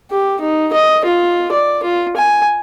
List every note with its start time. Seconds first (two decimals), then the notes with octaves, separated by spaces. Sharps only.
0.11 G4
0.41 D#4
0.73 D#5
1.05 F4
1.52 D5
1.83 F4
2.17 G#5